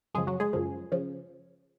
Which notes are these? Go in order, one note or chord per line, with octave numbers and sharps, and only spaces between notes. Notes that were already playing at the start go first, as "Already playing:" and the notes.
F#2 C#3 F3 G#3 G#4
F#3 F#4
G#3 G#4
F#2 C#3 F3
C#3 F3